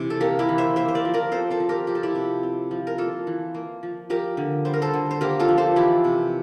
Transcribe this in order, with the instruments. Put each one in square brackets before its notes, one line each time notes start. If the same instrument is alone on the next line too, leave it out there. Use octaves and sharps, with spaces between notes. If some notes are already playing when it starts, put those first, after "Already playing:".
Already playing: [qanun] C3 E3
A4
A#3 G4 A#4
E4 G4
E3
C5 E5
A#3 C5 E5
C5
A#4 D5
F3
A#4 D5
C4 A4 C5
A4 C5
F3
G4 A#4
F3 G4
A4
E4 G4
C3
C4
F3
A#4
A#3 F4 A4
E3
A#3
F3
F3 G4 A#4
D3
G3 C5
A#4
A4 C5
D3
C5
A#3 G4 A#4
F4 A4
F3
A4 C5
E3 E4 G4
C3